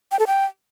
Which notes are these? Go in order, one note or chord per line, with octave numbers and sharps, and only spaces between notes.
G5
A4
G5